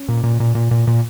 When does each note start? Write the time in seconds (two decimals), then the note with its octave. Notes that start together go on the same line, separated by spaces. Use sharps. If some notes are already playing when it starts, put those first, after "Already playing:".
Already playing: C#4
0.08 A#2
0.24 A#2
0.40 A#2
0.55 A#2
0.71 A#2
0.87 A#2